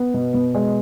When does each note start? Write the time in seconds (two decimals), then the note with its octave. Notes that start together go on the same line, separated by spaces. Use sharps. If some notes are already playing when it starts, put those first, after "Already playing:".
Already playing: B3
0.14 B2
0.34 B2
0.54 G#3